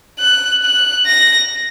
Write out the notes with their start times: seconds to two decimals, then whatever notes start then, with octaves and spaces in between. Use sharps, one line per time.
0.19 F#6
0.63 F#6
1.06 A#6